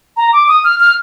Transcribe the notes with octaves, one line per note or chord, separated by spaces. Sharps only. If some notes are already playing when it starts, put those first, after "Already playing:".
A#5
D6
D#6
F6
F6